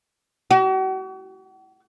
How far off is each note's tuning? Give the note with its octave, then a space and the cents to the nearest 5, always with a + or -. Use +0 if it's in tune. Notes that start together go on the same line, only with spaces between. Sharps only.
F#4 +40